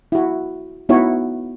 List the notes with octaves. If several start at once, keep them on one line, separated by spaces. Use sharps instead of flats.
E4 F#4
B3 D#4 E4 F#4 C#5